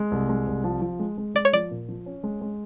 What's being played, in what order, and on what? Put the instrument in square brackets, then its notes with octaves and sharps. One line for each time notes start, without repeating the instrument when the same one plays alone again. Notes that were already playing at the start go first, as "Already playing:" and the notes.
Already playing: [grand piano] G#3
C2
G#3
C2
F3
F3
G#3
G#3
[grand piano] G#3 [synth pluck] D5
[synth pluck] C#5
[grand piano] F3 [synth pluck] D5
[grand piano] A#2
F3
C#4
G#3
G#3